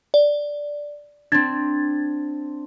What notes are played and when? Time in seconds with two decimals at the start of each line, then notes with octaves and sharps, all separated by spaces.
0.14 D5
1.32 C4 D4 G#6 A6